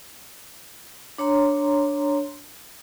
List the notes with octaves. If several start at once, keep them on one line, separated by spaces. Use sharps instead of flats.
D4 C#5 A#5 C6